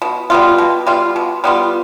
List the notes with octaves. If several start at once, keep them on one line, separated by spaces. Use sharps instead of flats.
B2
G3 B3 F4
B2
G3 B3 F4
B2
G3 B3 F4